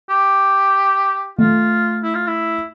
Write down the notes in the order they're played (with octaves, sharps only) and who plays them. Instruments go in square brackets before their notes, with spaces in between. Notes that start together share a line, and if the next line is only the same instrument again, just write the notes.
[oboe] G4
[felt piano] A3 [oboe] F4
[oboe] E4
F4
E4